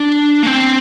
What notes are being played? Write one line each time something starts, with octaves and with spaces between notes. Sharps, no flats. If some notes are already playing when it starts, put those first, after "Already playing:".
Already playing: D4
A#3
C4